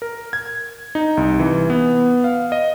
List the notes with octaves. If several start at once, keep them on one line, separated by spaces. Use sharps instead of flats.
A#4
G#6
D#4
C2
E3
B3
F5
D#5